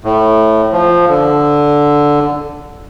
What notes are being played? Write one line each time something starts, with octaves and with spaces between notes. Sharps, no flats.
A2
F3
D3